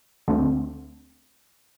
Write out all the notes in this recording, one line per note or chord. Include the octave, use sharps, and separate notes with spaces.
D2 D3 A3 C4